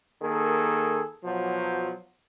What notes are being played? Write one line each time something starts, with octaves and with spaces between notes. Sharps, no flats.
D#3 A#3 G#4 A4
B2 F3 F#3